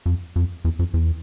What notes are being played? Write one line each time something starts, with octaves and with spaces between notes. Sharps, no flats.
F2
F2
E2
F2
E2